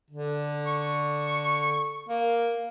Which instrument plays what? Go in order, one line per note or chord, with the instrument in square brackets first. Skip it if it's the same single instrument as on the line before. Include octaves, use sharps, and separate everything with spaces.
[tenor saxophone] D3
[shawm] C#6
[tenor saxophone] A#3